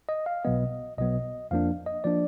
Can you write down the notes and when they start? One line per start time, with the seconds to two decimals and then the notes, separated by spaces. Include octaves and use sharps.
0.09 D#5
0.26 F5
0.45 B1 B2 F#3 B3 D#5
0.98 B1 B2 F#3 B3 D#5
1.51 F2 F3 A#3 D4 F5
1.86 D#5
2.04 F3 A#3 D4 D5